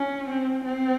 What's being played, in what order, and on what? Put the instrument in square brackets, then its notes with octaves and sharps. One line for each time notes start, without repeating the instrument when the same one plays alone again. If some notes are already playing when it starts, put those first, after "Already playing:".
Already playing: [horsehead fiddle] C#4
C4
C4